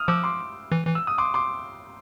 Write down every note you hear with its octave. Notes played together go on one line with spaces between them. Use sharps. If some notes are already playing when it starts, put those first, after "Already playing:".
Already playing: D#6 F6
F3 D6 E6
C6 D6
E3
E3
E6
D#6
C6 D6
C6 D6